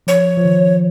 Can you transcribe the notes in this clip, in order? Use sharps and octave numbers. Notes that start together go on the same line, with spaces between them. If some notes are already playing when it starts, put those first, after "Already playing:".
F3 C#5
F3
D#3